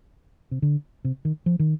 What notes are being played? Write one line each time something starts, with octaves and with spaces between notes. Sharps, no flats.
C3
D3
C3
D#3
F3
D#3